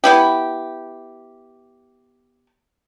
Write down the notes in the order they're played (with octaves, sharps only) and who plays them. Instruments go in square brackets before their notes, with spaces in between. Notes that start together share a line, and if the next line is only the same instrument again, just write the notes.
[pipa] B3 E4 G4